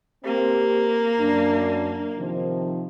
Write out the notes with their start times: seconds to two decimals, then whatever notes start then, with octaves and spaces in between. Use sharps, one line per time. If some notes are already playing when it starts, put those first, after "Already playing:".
0.25 A#3 C4 G4 C5
1.20 F#2 D4
2.18 C3 D#3 F3